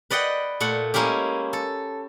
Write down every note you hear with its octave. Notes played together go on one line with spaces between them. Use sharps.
B4 D5 D#5 F#5 G5
A#2 A3 F#5
G#3 A#3 C#4 E4 G4
A4